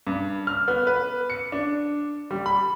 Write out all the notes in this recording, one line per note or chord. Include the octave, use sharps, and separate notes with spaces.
G2
F6
B3
B4
C#7
D4
G3
B5